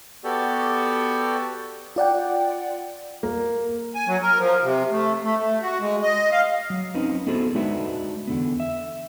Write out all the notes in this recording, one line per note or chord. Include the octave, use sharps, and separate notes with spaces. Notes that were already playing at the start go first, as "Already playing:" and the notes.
B3 F#4 G4 A4 D5
F4 D5 F#5 G5
A#3
G#5
F#3
A#4
F3
C3
A3
A3
A3
F#4
G#3
D#5
F5
F#3
C4 C#4 D#4 B4
B3 E4 F#4 G#4 A4 C5
G#3 D4 D#4 F#4 B4 E5
E2 D3 B3
E5